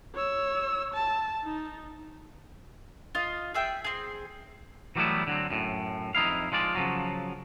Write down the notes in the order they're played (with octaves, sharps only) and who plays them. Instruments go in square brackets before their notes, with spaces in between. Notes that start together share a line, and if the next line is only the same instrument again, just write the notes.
[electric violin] C#5 E6
A5
D#4
[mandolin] F4 D#5
G#4 E5 G5
C4 G#4
[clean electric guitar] E3 F#3 G3 A3 B3 E4
D3 F#3 C4
F#2 A2
F2 D#4 E4 F5
F3 G#3 F4 D5
C#3 F3 F#3